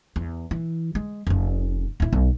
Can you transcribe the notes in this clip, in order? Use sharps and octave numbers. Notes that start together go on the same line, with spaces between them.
E2
E3
G#3
F1 C#3
D1 E4
B1